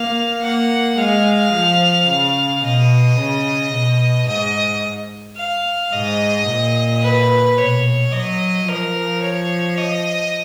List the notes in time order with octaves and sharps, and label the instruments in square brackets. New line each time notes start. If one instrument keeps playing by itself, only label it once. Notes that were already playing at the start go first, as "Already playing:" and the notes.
Already playing: [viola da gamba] A#3 [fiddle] F5
[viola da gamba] A#3 [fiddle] F#5
[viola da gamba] G#3 [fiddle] F5
[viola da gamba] F3
C#3
[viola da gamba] B2 [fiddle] D#5
[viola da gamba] C#3
B2
[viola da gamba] G#2 [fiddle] D#5
[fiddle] F5
[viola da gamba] G#2 [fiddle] D#5
[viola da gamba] A#2
[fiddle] B4
[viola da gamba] B2 [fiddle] C#5
[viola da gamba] F#3 [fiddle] D#5
[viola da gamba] F3 [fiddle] A#4
[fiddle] C#5
D#5